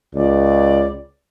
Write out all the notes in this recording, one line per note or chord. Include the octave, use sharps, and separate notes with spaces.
C#2 D5